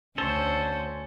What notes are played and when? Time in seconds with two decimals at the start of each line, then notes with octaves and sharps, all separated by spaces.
0.18 D2 C#4 A4 C5